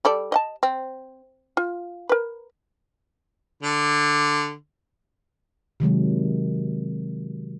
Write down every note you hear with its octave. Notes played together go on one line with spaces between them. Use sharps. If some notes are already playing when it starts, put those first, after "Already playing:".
G3 A4 D5
D#5 F#5 A5
C4
F4
A#4 B4
D3
C3 D#3 F#3 G#3